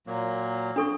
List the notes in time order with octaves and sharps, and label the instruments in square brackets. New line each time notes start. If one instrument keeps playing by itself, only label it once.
[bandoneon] A#2 F#3 A#3
[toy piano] D4 A4 C#6